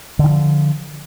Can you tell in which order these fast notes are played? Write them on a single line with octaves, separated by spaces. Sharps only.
D3 D#3 F3